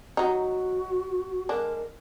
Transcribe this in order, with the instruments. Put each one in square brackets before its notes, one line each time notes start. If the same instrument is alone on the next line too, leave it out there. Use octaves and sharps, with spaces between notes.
[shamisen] F#3 D#4 [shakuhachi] F#4
[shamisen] D3 G#3 D4 [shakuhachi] A#4